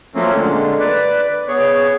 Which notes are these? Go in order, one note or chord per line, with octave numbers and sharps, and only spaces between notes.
F3 F#3 A3 A#3 C4 C#4
A#2 D3 G#3
B4 D5
B3 G#4 C#5